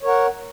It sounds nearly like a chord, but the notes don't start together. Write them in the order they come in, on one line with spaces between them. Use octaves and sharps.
C#5 A#4 F#5